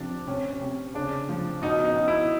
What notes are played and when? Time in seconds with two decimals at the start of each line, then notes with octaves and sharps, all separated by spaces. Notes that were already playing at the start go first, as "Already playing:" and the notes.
Already playing: C3 F3 D4
0.27 C3 C#4
0.51 C#4
0.61 C3
0.94 C#3 D4
1.29 F3
1.62 B2 D#4
1.84 D#4
1.96 B2
2.08 E4